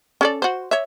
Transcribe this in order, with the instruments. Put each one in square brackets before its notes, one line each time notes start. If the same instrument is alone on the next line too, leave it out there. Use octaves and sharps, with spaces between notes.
[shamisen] C#4 A4 D5
F#4 C5
C#5 E5